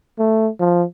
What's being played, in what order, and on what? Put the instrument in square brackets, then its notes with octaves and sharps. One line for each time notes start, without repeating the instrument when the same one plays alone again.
[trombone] A3
F3